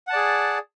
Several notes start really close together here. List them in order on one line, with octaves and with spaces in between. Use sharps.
F#5 A5 D5 G#4